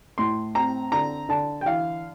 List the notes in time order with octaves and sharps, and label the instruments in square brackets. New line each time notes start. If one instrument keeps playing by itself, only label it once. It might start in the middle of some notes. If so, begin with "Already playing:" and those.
[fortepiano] A2 C6
C4 A#5
D3 A#5
D3 A5
G5
E3 F5